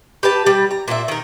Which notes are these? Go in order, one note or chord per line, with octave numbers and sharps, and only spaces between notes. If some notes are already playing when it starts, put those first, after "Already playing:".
G4 B4 A5
G3
A#5
A#2 A#3 F#4 E5
D#3 A#4